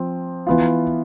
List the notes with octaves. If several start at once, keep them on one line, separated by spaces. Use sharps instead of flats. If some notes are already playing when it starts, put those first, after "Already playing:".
Already playing: F3 C4
E3 B3 F4